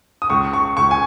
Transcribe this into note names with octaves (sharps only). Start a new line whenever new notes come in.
D#6
C#2 C#6
C#6
C#2 C#6
G#5